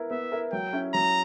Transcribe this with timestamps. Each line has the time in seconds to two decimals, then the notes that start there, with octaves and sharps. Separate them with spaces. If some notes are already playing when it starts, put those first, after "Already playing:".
Already playing: B3 E4 A#4
0.11 B3 E5
0.32 E4 A#4
0.52 F#3 G5
0.73 C#4 E4
0.94 F#3 A#5